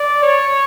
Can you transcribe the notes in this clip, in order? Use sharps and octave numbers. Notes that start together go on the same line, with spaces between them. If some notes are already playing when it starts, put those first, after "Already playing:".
Already playing: D5
C#5